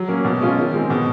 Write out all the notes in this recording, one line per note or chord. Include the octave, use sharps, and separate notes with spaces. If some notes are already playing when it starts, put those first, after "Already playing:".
Already playing: F#3
A#3 C#4
B2
G#3 C#4 F4
D#3
G#3 C4
B2